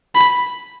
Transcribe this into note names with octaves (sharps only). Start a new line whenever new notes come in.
B5